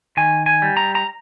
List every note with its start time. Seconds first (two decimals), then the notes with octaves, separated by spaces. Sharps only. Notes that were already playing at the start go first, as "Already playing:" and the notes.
0.17 D#3 G#5
0.46 G#5
0.62 G3
0.77 A#5
0.95 A#5